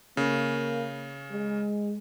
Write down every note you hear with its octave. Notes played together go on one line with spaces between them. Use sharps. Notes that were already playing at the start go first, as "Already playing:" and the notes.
C#3 A#3
G#3